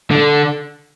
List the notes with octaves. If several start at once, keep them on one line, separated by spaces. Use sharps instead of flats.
D3